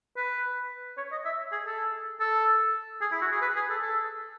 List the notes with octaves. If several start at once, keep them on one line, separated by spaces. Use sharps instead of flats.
B4
C#5
D#5
E5
G#4
A4
A4
G#4
E4
F#4
G#4
B4
G#4
A4
A4